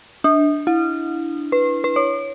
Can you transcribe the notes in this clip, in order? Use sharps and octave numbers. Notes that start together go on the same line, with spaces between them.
D4
E4
B4
B4
C#5